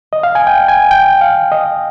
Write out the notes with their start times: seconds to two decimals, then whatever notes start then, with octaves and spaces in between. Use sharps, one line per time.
0.13 D#5
0.23 F5
0.35 G#5
0.47 G5
0.68 G#5
0.91 G5
1.21 F5
1.52 D#5